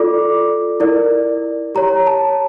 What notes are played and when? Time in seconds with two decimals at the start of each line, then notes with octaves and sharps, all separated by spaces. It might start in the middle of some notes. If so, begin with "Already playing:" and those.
Already playing: F4 A4 D5 D6
0.80 E4 A#4 D5
1.75 G4 C#5 A#5
2.07 A5